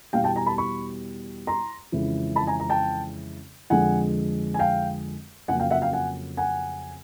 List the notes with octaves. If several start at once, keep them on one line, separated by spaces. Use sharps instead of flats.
E2 B2 G3 F5 G5
G5 A5
G#5 A#5
A5 B5
B5 C#6
A#5 C6
F2 C#3 E3 G#3
A5 B5
G#5 A#5
A#5
G5 A5
F2 D3 F3 G#3 F#5 G#5
G#5
F5 G5
F2 C#3 F#3 A#3 F#5 G#5
F5 G5
E5 F#5
F5 G5
F#5 G#5
F#5 G#5